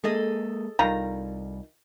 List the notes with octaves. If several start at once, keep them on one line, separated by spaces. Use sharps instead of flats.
G#3 A#3 G#4 A4 D#5
C2 D#3 G3 F4 A#5